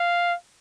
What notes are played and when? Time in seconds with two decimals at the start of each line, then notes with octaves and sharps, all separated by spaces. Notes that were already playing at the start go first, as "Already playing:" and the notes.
Already playing: F5